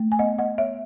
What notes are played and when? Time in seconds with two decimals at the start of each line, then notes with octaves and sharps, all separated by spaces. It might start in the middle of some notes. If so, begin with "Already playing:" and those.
Already playing: A3
0.12 G#5
0.19 B3 D#5 F#5
0.39 D#5 F#5
0.46 B3
0.58 C#5 E5